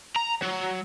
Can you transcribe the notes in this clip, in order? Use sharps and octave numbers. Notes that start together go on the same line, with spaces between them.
A#5
F#3